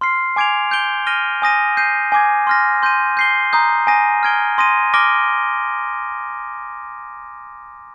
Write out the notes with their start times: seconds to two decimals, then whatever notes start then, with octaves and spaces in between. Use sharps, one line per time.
0.01 C6 F6 C7
0.36 G#5 D6 G#6 D7 F7
0.71 G6 D7 G7
1.07 F6 A#6 D#7 G7
1.42 G#5 D#6 A#6 D#7
1.77 G6 C7 D#7
2.12 G#5 D6 G#6
2.47 C6 F6 A#6
2.83 C6 G6 A#6 D#7
3.17 G6 C7 G7
3.53 A#5 D#6 G6
3.87 G#5 D#6 A#6 D#7
4.23 F6 G#6 D7 G7
4.58 C6 D#6 A#6 D#7
4.94 D6 F6 A#6 D7 G7